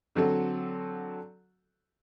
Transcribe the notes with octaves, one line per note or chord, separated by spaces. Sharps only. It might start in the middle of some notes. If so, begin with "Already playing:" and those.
D3 F#3 C4 F#4 A4